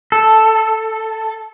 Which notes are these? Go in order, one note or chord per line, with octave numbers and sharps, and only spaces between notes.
A4